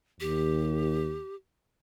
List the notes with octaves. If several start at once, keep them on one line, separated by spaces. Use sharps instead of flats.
D#2 G4